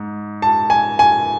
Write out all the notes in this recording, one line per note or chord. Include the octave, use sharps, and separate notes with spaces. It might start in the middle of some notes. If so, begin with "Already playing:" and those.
Already playing: G#2
A5
G#5
G#5